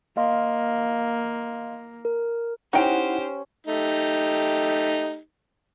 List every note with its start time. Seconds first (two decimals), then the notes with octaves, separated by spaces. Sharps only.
0.17 A#3 D#5 F5 C6
2.05 A#4
2.73 C#4 D#4 E4 G4 C5 F#5 G5
3.67 A3 D#4 G4